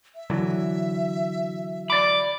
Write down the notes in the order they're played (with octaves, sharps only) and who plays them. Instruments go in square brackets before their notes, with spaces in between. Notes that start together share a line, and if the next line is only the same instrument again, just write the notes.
[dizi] E5
[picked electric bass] D3 E3 F#3
[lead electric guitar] D5 B5 [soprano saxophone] D6